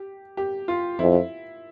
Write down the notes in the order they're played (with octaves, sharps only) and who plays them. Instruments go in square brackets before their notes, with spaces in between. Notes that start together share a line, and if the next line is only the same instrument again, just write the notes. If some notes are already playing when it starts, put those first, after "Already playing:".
Already playing: [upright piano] G4
G4
F4
[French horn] F2 [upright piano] E4